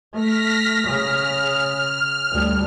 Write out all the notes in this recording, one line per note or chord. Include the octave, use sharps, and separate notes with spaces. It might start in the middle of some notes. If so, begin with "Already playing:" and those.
A3 F6 A#6 B6
C#3 F6
D2 G3